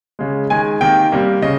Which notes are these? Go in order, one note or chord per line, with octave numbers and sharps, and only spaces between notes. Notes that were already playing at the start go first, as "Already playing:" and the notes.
C#3 G#3
D#3 G#3 G#5
C3 D#3 A#3 G5
C3 G3 A#3
C#3 D#5